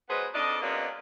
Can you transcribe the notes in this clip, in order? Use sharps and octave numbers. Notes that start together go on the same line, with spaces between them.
F#3 G#3 B3 G#4 B4 C5
F2 F3 D4 D5 D#5
F#3 G#3 A#3 B3 C#4 D5